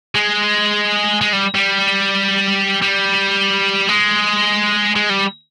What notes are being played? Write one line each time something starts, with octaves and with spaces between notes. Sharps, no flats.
G#3
G#3
G3
G3
G3
G#3
G#3
G3